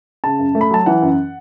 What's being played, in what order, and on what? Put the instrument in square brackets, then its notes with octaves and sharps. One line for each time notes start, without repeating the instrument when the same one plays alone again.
[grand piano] C#3 A5
F#2
A3
B5
F#3 A5
E3 F#5
F#2